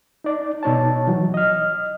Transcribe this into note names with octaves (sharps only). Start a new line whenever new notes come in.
D#4 D5
B2 D#4 C#5 A5
E3 F#3
D#5 F6